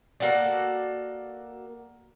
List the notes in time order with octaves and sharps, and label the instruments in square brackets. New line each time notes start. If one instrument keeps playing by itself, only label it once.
[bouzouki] A#3 F#4 A4 D5